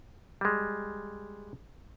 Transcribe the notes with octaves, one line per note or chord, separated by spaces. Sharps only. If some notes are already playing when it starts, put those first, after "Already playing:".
G3 G#3